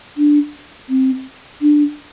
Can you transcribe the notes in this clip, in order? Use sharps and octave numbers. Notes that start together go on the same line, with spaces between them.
D4
C4
D4